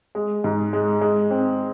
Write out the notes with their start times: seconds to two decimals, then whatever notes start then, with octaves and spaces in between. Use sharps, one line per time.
0.15 G#3
0.44 G#2
0.73 G#3
1.01 G#3
1.30 C4